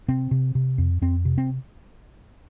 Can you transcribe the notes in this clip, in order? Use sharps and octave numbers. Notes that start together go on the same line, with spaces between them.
C3 C4
C3
C3
F2
F2 C4
C3
C4